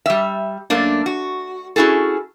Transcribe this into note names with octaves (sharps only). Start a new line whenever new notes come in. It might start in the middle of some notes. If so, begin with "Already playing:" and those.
G3 E5
F#2 A3 A#3 D4
F#4
C#4 E4 F#4 G#4 A4